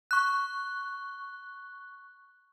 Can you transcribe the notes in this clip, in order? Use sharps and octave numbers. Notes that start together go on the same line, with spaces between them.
C#6 F#6